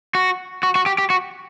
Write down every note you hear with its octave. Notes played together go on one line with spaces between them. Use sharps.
F#4
F#4
F#4
G4
G4
F#4